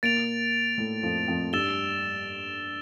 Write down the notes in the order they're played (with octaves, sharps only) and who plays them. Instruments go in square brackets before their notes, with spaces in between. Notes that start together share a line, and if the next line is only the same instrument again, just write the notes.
[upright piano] A#2 A#3 [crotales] A6 D7 F7
[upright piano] A2 A3
F2 F3
F2 F3
[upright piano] G2 G3 [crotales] E6 A6 E7 G7